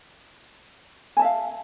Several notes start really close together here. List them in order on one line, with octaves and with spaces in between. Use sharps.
G#5 A5 E5 F5